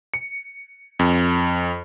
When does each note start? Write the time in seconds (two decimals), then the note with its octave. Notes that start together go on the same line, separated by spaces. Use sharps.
0.14 C#7
0.99 F2